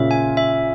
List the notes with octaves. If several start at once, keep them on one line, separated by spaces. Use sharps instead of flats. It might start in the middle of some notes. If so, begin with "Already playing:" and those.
Already playing: A#2 C#3 E5
G#5
E5